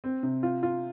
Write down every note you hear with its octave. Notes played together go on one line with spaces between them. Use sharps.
C4
C3
F4
F4